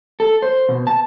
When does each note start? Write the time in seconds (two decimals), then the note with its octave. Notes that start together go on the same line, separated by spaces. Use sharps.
0.20 A4
0.42 C5
0.69 B2
0.87 A5